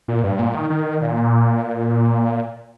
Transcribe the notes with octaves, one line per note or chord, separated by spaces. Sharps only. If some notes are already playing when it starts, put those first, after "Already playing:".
A#2
G2
A#2
D#3
D#3
A#2